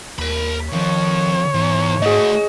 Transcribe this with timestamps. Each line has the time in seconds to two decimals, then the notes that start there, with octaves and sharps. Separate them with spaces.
0.19 D#2 A#4 B5
0.72 F2 D#3 F3 C#5
1.54 E2 G#2
2.02 A3 F#4 G#4 D#5